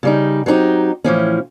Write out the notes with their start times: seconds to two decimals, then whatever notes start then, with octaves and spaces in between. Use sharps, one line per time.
0.03 C#3 G3 D#4
0.46 F#3 C4 C#4 D#4 G4
1.04 A2 E3 F3 C#4